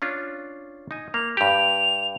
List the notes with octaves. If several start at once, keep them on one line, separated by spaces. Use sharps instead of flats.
C#4 D4 F4
D#4 G#5
A#3 F7
G2 G4 F7